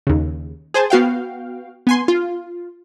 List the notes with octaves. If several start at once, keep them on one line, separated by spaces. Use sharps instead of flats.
D#2 C#3
G#4 C5 G#5 A5
B3 F#4 F5 G5
B3 G#5 C6
F4